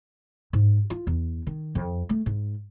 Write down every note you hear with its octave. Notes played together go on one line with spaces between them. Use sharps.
G#2
F4
E2
D#3
F2
A3
G#2